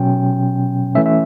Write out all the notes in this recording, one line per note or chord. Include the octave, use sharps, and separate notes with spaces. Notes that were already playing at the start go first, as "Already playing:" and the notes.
Already playing: B2 F#3 C#4 G5
E3 A3 C#4 E5
E5